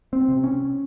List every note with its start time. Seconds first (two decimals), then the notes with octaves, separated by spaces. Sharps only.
0.13 C4
0.28 C3
0.44 C#4